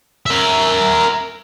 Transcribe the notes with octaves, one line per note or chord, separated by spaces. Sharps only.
A#4 E5